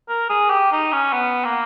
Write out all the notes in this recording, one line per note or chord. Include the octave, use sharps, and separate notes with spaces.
A#4
G#4
G4
D#4
C#4
B3
A#3